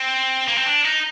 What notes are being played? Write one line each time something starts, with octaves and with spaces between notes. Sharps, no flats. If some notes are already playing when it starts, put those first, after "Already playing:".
Already playing: C4
A#3
C4
D4
D#4